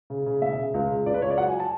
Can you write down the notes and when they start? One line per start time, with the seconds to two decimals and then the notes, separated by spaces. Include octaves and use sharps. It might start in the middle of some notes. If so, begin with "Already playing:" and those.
0.10 C#3
0.26 C#3
0.41 E1 E5
0.58 C#3
0.74 C#2
0.90 C#3
1.06 C#2 D5
1.14 B4
1.22 C#2 C#5
1.30 D5
1.38 F#3 F#5
1.49 G#5
1.60 A5